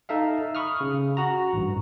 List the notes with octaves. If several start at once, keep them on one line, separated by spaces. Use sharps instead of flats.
D#4 A4 E5 F5
B5 C#6 D#6 F6
C#3
F#4 A#5
A1 G2